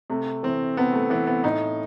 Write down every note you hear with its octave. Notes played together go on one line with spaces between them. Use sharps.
C3 A3
E3 C4
C3 B3
A3
E3 B3
B3
A2 D#4